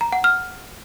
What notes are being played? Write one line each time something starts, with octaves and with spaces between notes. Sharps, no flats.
A#5
F#5
F6